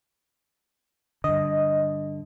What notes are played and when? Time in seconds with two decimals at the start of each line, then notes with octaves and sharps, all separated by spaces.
1.24 G2 D3 D#5